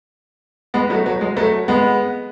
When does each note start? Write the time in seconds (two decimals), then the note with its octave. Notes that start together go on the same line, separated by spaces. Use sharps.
0.74 G#3 B3
0.90 F#3 A3
1.06 F#3
1.21 G#3
1.36 F#3 A3
1.68 G#3 B3